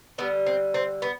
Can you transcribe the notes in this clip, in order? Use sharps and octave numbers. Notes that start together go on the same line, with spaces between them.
D3 G3 B3
C4
C4
B3